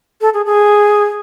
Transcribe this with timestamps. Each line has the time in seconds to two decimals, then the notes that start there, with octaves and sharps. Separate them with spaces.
0.21 A4
0.34 G#4
0.46 G#4